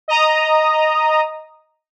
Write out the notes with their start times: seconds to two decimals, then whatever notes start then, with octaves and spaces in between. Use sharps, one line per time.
0.08 D#5 A#5 D#6